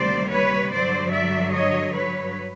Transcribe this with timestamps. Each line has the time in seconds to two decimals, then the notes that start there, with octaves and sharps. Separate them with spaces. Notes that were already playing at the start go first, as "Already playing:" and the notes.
Already playing: D2 C3 D#3 G3 A#3 C5 D5
0.31 B4 C#5
0.72 G2 D3 F#3 C5 D5
1.13 D5 E5
1.53 C#5 D#5
1.94 B4 C#5